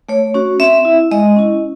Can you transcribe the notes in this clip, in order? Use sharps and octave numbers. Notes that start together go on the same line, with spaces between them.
A3 C#5
C#4 F#4
C4 E5
E4
G#3 D#5
C#4 E4